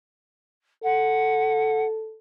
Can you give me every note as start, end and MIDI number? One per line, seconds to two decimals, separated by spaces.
0.84 2.19 69
0.84 1.85 78